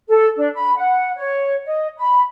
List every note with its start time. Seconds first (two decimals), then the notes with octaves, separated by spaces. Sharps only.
0.08 A4
0.37 D4
0.55 B5
0.76 F#5
1.15 C#5
1.65 D#5
1.97 B5